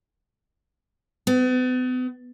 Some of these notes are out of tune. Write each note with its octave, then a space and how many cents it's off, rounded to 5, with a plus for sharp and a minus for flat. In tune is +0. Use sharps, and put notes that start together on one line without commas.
B3 +40